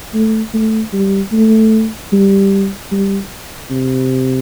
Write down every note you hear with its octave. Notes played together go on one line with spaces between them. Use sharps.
A3
A3
G3
A3
G3
G3
C3